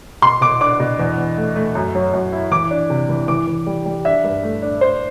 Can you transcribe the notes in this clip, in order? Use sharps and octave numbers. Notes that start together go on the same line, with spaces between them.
B2 C6
B2 D6
D4 D6
B2
E2
E2
A3
A3
F#2
F#3
F#2
E4
E3 D6
D4
C3
E3
E3 D6
E3
G3
G3
D4 E5
G2
A3
D4
D4 C5